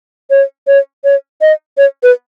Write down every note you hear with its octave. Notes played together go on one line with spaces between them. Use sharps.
C#5
C#5
C#5
D#5
C#5
B4